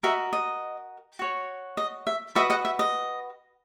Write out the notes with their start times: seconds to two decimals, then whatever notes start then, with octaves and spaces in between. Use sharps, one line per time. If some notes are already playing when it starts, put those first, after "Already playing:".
0.03 F#4 A#4 D#5 E5
0.33 D#5
1.19 F#4 C#5
1.77 D#5
2.07 E5
2.35 F#4 B4 D#5 E5
2.50 D#5 F#5
2.65 E5
2.79 D#5